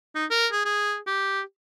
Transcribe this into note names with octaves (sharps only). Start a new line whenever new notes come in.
D#4
A#4
G#4
G#4
G4